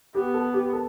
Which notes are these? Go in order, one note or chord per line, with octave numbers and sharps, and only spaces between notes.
B3 G4
A4
G4
A4